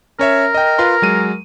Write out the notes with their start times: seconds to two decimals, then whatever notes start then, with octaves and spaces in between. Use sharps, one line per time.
0.19 C#4 A#4 C#5 E5
0.54 D#5 G5
0.79 F4 B4 C6
1.02 F#3 G#3 D#7